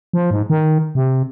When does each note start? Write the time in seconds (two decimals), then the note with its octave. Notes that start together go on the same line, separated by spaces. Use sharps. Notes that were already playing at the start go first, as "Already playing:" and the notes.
0.13 F3
0.31 G#2
0.50 D#3
0.95 C3